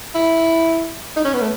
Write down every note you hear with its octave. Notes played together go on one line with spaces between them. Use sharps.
E4
D#4
C#4
B3
A3